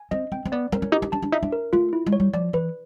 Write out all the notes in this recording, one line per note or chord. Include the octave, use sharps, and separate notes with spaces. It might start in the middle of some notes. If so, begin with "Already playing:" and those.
Already playing: G#5
C4 D#5
C4 G5
C4
B3 D5
C4 A#4
C#4
D#4 G4
D#4
D4 A5
D4
D#4 E5
D4
A#4
A3 F4
E4
G#3
C#5
G3
F3 D5
E3 B4